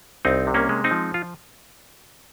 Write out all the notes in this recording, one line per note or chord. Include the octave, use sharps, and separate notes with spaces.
C2 C4 D#4
C3
A#3 C#4
G#3
C4 D#4
F3
F4